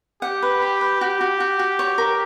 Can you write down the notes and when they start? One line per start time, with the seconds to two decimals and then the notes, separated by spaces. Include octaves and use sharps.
0.22 G4 F#5
0.42 B4
0.62 B5
0.81 B4
1.01 F#4 G4
1.21 F#4
1.40 F#4
1.59 F#4
1.79 C#5
1.98 A#4